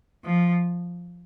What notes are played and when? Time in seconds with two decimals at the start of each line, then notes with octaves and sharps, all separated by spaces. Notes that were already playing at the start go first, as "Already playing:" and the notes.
0.24 F3